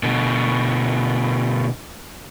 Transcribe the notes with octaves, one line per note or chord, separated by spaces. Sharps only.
B2 D3